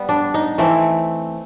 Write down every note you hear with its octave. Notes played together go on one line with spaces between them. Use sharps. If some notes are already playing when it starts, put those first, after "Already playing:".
Already playing: G3 B3
D4
D#4
E3 A3 C4